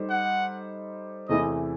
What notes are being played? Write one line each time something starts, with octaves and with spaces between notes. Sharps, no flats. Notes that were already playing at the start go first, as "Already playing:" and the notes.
Already playing: G3 D#4 A4 C5
F#5
E2 C3 E3 A3 E4 D#5